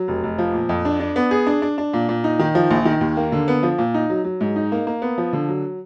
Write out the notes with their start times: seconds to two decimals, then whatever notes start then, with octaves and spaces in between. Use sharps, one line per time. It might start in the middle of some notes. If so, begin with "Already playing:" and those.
Already playing: F#3
0.08 F1
0.24 F1
0.38 F3
0.53 A#2
0.69 F2
0.85 D4
1.00 D4
1.16 B3
1.31 G#4
1.47 D4
1.62 D4
1.78 D4
1.93 A#2
2.09 A#2
2.24 D#4
2.39 D#3
2.55 F3
2.71 A#1
2.85 D#3
3.01 D#2
3.17 A#3
3.32 D3
3.48 B3
3.63 F3
3.78 A#2
3.94 D#4
4.10 F#3
4.24 F#3
4.41 G#2
4.56 D#4
4.72 A#3
4.87 A#3
5.02 B3
5.18 F3
5.33 D3
5.49 F#3